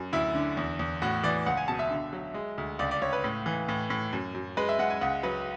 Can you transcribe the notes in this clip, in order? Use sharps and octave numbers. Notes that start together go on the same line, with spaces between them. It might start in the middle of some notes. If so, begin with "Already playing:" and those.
Already playing: F#2
D2 E4
D3
E2
E2
A2 F#4
E3 D5
C#2 F#5
G#5
B2 A5
E5
D3
F#3
G#3
D2
C#2 D5
D5
C#2 C#5
B4
A2
E3
A2
A2
F#2
F#2
G#3 B4
E5
G#3 F#5
G#5
C#2 F#5
F#3 B4